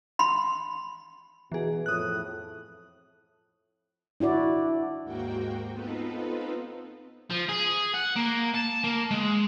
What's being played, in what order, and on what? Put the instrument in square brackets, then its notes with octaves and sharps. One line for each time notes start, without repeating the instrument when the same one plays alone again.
[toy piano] B5 C6
[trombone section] B2 [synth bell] E3 G#4
[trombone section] F2 A2 [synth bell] D#6 F#6
[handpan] D4 E4 F#4 D5
[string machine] D#2 G#2 A#3 F#4 G5
B3 C4 D#4 F4 A4 B4
[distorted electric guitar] F3
G#4
F#5
A#3
A5
A#3
G#3